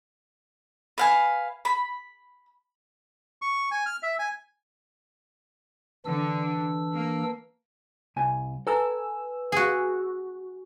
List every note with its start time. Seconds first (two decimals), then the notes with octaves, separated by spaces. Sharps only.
0.98 B4 F5 G#5
1.65 B5
3.42 C#6
3.71 G#5
3.86 F6
4.03 E5
4.19 G#5
6.05 D3 E3 D4 E6
6.93 A#3
8.16 C2 G#5
8.67 A4 B4 G#5 A#5 E6
9.52 F#4 G#4